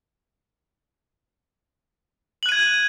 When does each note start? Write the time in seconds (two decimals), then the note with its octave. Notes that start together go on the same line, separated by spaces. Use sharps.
2.43 F#7
2.46 F#6
2.49 D#7
2.52 G#6